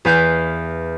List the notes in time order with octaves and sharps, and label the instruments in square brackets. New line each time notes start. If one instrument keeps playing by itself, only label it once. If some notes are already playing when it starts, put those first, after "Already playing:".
[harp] E2 B4 F5 G6 E7